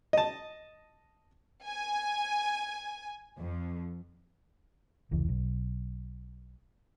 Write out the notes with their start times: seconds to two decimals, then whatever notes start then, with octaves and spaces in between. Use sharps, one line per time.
0.13 D#5 A5
1.65 G#5
3.37 F2
5.11 F1 C#2 E3
5.29 B1